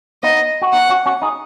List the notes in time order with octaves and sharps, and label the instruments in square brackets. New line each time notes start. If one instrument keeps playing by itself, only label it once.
[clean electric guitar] B3 D#4 [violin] D#5
[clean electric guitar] F#4
[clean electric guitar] B3 D#4 [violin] F#5
[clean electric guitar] C#4 F#4
C#4 F#4
D#4 G#4